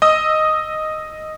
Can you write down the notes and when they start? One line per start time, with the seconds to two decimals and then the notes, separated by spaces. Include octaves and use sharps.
0.02 D#5 D#6 E6